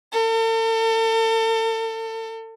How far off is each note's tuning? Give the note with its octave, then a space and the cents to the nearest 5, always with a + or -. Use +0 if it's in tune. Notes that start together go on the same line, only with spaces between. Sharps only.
A4 +40